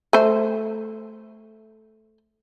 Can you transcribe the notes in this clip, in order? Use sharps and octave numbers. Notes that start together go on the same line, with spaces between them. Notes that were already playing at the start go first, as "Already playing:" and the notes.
A3 C5